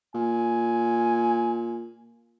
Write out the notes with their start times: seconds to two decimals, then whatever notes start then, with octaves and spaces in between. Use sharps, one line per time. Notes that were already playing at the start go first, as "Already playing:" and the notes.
0.15 A#2 G#5